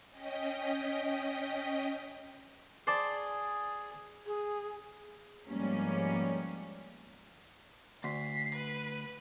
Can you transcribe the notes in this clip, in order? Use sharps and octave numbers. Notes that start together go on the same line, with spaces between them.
C#4 D#5 G5 B6
G#4 C5 D5 A5
G#4
G#2 F3 G3 A#3 B3 C#4
D2 B6 C7
B4